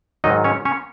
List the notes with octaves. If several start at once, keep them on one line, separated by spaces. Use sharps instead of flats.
G#2 D#3 F#3 D#4 D#5
C#4 C#5
C#4 C#5